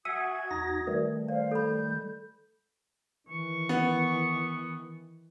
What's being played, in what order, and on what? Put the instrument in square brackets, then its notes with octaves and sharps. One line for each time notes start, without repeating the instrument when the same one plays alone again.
[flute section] F#4 D#6 G#6 [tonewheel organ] E5 F#5 G#5 [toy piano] E6
[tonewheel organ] E2 D#4 A#6
[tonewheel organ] D#3 G3 A3 [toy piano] B4
[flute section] C5 F5 [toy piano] D5
[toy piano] A4 B5 [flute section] G6
[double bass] D#3 E3 [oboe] C#6
[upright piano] B3